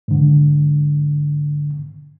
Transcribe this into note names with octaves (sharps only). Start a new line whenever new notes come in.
G#2 D3